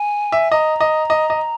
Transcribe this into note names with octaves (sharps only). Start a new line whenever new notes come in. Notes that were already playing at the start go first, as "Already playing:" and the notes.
Already playing: G#5
E5
D#5 A#5
D#5
D#5
D#5